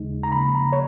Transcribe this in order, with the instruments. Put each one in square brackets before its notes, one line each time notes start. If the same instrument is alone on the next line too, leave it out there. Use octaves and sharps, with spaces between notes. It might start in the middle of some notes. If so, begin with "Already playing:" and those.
Already playing: [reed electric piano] D#2 C#3 G#3 D#4
A#5
C#3 F3 A#3 B5
A#5
C#5